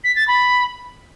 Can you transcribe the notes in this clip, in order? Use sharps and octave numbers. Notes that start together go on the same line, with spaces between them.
B6
A6
B5